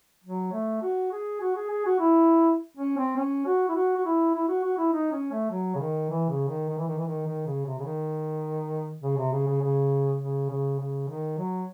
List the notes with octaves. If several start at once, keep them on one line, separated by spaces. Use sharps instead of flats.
F#3
A3
F#4
G#4
F#4
G#4
G#4
F#4
E4
C#4
C4
C#4
F#4
E4
F#4
F#4
E4
E4
F#4
F#4
E4
D#4
C#4
A3
F#3
C#3
D#3
E3
C#3
D#3
D#3
E3
D#3
E3
D#3
D#3
C#3
C3
C#3
D#3
C#3
C3
C#3
C#3
C#3
C#3
C#3
C#3
D#3
F#3